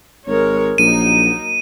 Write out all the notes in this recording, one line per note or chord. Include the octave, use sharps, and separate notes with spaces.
G#1 G#3 A#4 C#5
A#1 F#3 A#3 D#4 D#7